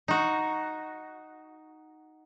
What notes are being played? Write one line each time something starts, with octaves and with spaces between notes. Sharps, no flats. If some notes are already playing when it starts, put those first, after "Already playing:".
D#4 F#4